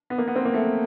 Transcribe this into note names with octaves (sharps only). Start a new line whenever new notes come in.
B3
A#3
B3
C4
A#3
A3